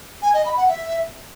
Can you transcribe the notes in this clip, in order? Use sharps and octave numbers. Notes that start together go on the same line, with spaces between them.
G#5
D#5
B5
F#5
E5